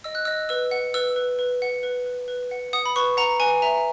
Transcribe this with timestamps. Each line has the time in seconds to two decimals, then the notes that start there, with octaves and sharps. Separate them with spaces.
0.04 D#5 E6
0.15 F#6
0.25 D#5 E6
0.49 B4 E6
0.71 F#5
0.94 B4 E6
1.16 B4
1.39 B4
1.62 F#5
1.83 B4
2.06 B4
2.28 B4
2.51 F#5
2.73 F#5 D#6
2.86 B5
2.96 B4 C#6
3.17 F#5 A#5
3.40 B4 G#5
3.62 E5 A#5